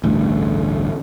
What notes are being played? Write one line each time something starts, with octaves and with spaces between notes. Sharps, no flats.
A1 D2 G2